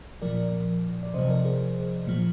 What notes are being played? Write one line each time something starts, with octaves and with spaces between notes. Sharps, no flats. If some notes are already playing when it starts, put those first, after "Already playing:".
A#2 F3 A#4 D5
D5
C3 F3 C5 D#5
A#4 D5
G#4 C5
A#2 F3